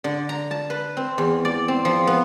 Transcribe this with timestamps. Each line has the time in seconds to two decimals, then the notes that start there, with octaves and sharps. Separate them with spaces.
0.04 D3
0.29 A#5
0.51 A5
0.70 B4
0.97 C4
1.18 E2
1.45 D5
1.68 C4
1.85 F3
2.07 B3